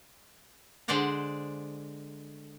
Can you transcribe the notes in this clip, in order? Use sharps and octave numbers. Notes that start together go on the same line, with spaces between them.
D3 G#3 C5 D5 F#5 A#5